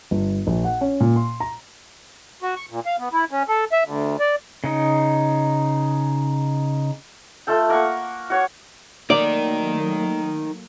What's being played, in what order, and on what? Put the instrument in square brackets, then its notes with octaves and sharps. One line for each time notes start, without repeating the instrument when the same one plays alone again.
[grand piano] G1
A#1
F#5
C#4
A#2
C6
A#5
[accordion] F#4
C#6
A#2
F5
B3
E4
C#4
A4
E5
D2
D5
[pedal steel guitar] C#3 D#4
[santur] A3 F4 A4 G5
A#3 A#4 F#5 C#6
F#4 C#5
[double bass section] F#3 A3 A#3 [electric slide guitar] D#4 A#4 [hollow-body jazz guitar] D5